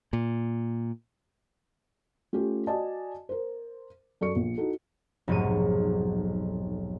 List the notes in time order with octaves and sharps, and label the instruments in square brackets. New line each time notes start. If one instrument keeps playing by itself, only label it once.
[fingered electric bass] A#2
[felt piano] A3 C#4 F4 G4 A4
F#4 D5 D#5 G#5 A5
A#4 C5
F#2 A4 D5 C#6 C#7
A#1
D#4 E4 F#4 A4
[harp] F1 B1 G#2 F#3 C#6 D#7